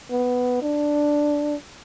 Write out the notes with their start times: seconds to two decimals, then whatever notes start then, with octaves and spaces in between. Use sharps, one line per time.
0.11 B3
0.62 D4